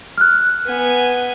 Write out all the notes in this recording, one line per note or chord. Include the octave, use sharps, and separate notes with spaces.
F6 F#6
B3 G#5